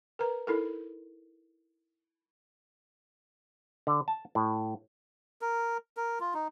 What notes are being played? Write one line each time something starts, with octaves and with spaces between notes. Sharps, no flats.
A#4 B4 A#5
D#4 E4 A4 A#4
D3
A5
A2
A#4
A#4
F4
D#4